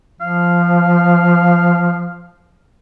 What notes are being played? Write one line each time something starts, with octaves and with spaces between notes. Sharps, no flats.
F3 F5